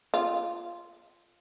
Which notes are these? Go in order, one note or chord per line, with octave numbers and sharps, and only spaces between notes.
F4